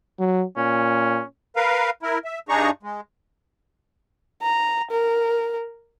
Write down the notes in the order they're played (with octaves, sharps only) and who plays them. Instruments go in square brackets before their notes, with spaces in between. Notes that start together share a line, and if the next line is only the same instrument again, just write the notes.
[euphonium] F#3
[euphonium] A#2 [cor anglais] C#4
[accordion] A#4 B4 F5
E4 A#4
E5
G2 D4 D#4 G#4 A#5 C#6
G#3
[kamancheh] A#5
A#4